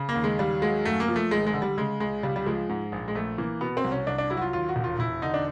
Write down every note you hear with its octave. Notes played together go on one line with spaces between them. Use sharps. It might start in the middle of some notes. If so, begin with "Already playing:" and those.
Already playing: C#3
A#3
D#2
G#3
D#2 G3
F#3 G#3
F#2 A3
A#3
F3
A3
G#1 G#3
G#3
D3
G3
C#3 G#3
C#2 G#3
C#2 G3
G3
F3 G#3
G#2
A#1
G#3
A#1 A3
E3 A#3
B2 B3
C4
C2
C#4
C2 D4
D4
F#3 E4
F#4
F4
D#2 F4
F#4
E1
F4
E1 E4
D3 D#4
D4